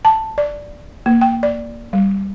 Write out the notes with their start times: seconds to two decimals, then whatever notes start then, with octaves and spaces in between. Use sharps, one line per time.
0.05 A5
0.38 D5
1.06 A#3
1.21 G5
1.43 D5
1.93 G3